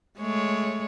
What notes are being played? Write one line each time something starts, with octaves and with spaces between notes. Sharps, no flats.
G#3 A3 C#5